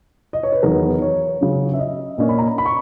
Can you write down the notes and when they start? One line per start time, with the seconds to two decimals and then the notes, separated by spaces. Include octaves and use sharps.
0.33 D#5
0.43 C#5
0.52 B4
0.63 E2 D#3 F#3 B3 A#4
1.02 C#5
1.41 C#3 F#3 C#4
1.74 E5
1.79 D#5
2.18 A#2 A#3 C#4 D#5
2.29 B5
2.39 A#5
2.58 B5
2.66 C#6